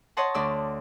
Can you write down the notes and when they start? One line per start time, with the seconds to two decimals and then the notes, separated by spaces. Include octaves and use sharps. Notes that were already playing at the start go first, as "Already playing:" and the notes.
0.17 C#5 D#5 F#5 A5 C6
0.34 D2 D5 E6